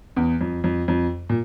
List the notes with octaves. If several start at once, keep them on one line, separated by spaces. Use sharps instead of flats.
E2
F2
F2
F2
A#2